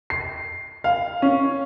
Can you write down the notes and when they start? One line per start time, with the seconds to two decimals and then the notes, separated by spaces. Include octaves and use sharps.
0.10 C7
0.84 F5
1.22 C#4